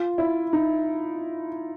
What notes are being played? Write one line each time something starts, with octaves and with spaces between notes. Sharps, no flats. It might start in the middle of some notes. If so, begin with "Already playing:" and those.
Already playing: F4
E4
D#4